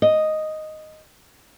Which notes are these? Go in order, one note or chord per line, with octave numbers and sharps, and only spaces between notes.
D#5